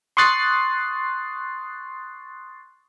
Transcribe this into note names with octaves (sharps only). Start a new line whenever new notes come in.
C6 C#6 D#6 F#6 A6 C7